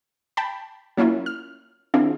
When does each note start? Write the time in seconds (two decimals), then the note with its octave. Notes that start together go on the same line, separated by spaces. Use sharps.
0.37 G5 A5 B5
0.97 F#3 A#3 C#4 E4 F4
1.26 F6
1.94 D#3 C4 D4 E4 F4 G#4